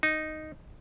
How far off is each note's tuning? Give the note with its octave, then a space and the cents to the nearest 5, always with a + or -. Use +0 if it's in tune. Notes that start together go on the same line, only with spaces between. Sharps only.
D#4 -5